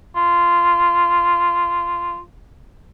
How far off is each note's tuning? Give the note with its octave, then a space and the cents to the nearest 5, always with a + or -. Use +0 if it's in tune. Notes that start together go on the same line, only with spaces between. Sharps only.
F4 -15